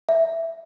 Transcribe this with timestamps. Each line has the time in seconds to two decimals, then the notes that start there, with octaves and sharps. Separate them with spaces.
0.09 E5